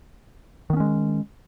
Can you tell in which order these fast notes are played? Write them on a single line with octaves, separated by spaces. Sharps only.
D#3 B3 C#4 G#3